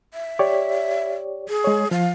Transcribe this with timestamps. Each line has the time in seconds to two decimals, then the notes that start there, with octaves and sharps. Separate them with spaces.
0.14 E5
0.39 G4 C#5 D5
1.49 G#4
1.64 G#3 C#5
1.91 F3 F5